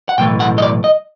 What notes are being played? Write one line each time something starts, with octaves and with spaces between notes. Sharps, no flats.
F#5
B1 A2 E3 A3 G5
F#5
D#5
D5
D#5